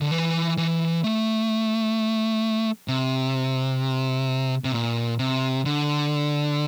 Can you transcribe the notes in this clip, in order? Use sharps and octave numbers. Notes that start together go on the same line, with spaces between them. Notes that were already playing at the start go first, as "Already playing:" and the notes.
D3
E3
E3
A3
C3
C3
A#2
C3
D3